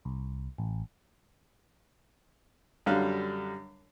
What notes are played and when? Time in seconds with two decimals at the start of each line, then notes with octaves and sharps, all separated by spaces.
0.05 C2
0.58 A1
2.86 F#2 D3 G3 F5 F#6